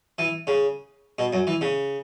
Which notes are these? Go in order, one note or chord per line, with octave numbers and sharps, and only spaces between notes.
E3
C#3
B2
F#2
E3
C#3